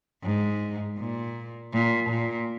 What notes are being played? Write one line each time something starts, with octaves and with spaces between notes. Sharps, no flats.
G#2
A#2
A#2
A#2